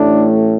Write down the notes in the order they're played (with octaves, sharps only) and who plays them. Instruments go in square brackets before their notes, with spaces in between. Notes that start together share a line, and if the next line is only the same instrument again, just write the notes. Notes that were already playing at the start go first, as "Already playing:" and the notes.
Already playing: [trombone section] A1 A2 A3 D4